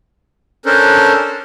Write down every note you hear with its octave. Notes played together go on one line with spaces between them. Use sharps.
C#4 D4 A4 A#4 C5